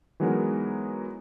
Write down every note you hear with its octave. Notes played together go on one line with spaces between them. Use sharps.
E3 F#3 G#3 B3 D#4 A#4